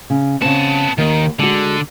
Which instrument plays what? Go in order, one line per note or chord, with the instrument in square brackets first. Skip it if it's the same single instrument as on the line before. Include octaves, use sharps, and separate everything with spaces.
[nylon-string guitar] C#3
[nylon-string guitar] C#3 C4 [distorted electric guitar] B3 A5
[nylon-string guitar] D#2 [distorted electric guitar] D#3
[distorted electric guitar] D3 [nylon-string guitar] G#3 F#4